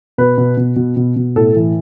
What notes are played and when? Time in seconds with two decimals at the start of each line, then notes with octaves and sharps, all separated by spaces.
0.18 B2 B4
0.38 B2
0.57 B2
0.76 B2
0.97 B2
1.16 B2
1.36 A2 A4
1.56 E3